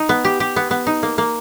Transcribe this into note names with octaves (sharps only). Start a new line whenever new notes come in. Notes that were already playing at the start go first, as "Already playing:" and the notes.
Already playing: D#4
B3
G4
G4
B3
B3
D#4
A#3
A#3